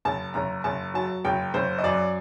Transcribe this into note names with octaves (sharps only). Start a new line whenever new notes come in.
F#1 A5
F#1 A#5
F#1 A5
F#3 A5
F#1 G5
F#1 C5
D#5
F#2 D5